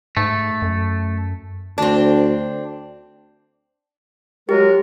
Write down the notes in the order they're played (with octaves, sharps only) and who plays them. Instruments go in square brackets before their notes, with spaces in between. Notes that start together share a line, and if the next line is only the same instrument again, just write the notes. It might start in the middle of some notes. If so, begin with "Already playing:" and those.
[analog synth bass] G#2 [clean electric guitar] A3
[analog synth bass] F#2
[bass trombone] D2 [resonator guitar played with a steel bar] C4 D4
[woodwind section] F#3 G#3 A#4 [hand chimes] G4